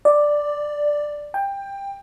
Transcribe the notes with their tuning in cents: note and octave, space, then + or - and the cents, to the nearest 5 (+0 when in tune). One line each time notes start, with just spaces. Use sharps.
D5 +5
G5 +20